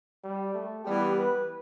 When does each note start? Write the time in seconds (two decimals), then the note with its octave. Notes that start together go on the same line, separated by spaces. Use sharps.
0.24 G3
0.54 A3
0.84 E3 G3 B3 G4
1.15 B4